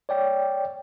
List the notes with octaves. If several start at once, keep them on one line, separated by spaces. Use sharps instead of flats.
C#5 D5 G5